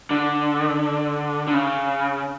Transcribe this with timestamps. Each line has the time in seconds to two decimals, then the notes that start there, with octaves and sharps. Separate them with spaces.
0.11 D3
1.47 D3
1.54 C#3